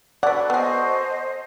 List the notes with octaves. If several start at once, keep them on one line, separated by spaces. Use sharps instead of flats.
F#4 A4 B4 D5 F#5
B3 G#4 C5 D#5